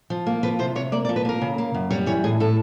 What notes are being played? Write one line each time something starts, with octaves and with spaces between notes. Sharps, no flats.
F3
A#3
F3 B4
C3 C5
C3 C#5
A#3 D5
D5
F3
B4
A#3 A#4
C#3
A#3
F#2
G3 C#5
E3 C#5
A2 G#4
A2 A4